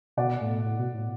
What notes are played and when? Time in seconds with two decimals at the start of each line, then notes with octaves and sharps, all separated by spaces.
0.17 B2 D5 F#5
0.41 A2
0.64 A2
0.79 B2
0.94 A2